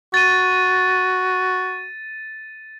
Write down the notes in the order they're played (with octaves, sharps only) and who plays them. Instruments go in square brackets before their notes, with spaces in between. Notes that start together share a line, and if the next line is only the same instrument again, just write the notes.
[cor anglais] F#4 [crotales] A6 D#7